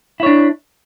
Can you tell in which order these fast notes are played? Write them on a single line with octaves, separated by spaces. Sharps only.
E4 C#5 D4